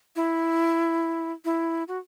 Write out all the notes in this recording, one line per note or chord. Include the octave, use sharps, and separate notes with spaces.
E4
E4
F#4